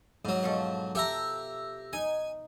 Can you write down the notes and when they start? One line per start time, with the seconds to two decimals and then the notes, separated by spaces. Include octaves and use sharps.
0.25 G#2 F#3
0.43 B2 F3 A4
0.95 G4 A4 E5 A#5
1.93 D#4 G#5